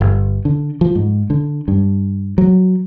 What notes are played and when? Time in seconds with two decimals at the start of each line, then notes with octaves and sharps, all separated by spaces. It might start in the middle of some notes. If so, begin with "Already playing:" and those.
0.01 G1
0.45 D3
0.81 F3
0.95 G#2
1.30 D3
1.68 G2
2.38 F#3